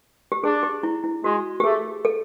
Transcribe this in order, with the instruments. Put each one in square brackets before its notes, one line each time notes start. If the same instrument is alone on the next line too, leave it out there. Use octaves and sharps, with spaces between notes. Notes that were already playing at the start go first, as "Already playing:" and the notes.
[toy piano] G4
[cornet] D4 [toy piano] G#4
[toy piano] G4
E4
E4
[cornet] G#3 [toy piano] F#4
[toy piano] G4
[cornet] A3 [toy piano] G#4
[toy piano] A4